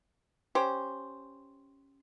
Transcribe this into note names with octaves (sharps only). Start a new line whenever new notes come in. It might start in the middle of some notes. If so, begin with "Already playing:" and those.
C#4 G4 C5